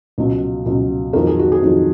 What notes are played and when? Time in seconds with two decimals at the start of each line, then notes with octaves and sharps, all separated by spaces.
0.18 C#2 B2 F#3
0.66 C#2 B2 F#3
1.13 F2 D#3 F#3 A#4
1.27 G#4
1.39 F#4
1.52 G#4
1.62 F2 D#3 F#3